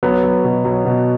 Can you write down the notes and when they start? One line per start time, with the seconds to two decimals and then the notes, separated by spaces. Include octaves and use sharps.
0.03 F#3 B3
0.23 F#3
0.44 B2
0.64 F#3
0.85 B2